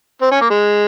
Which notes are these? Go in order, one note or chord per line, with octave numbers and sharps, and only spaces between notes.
C4
C#4
A#3
G#3